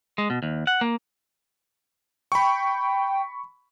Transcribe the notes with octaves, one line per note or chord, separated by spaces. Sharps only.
G#3
B2
D#2
F#5
A#3
G5 B5 C#6